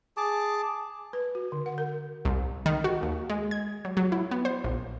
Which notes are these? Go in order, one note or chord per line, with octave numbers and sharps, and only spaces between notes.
G#4 A5 D6
B4
F#4
D3
F#5
A#4
C2
D#3
F#4
D#2
G#3
G#6
F#3
F#3
E4
B3
C5
A#1